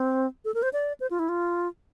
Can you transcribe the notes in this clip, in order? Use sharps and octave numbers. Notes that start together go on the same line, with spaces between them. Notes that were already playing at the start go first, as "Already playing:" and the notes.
Already playing: C4
A4
A#4
C5
D5
C5
F4
E4
F4